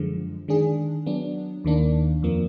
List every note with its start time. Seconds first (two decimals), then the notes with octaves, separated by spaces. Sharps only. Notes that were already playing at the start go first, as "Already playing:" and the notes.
Already playing: F#2 D3 F3 G#3
0.48 D#3 G#3 D4 G#4
1.06 F#3 B3 D4
1.65 D#2 D#3 A#3 D4
2.23 F2 F3 A#3